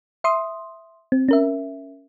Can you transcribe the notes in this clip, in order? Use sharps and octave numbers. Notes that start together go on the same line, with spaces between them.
E5 C6 D#6
C4
C#4 A#4 E5